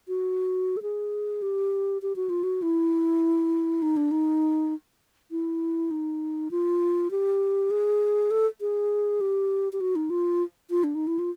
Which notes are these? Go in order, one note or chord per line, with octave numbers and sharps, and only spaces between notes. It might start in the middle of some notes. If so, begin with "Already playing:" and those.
F#4
A4
G#4
G4
G4
F#4
F4
F#4
E4
D#4
D4
D#4
E4
D#4
F4
G4
G#4
A4
G#4
G4
G4
F#4
D#4
F4
F4
D4
D#4
E4
F4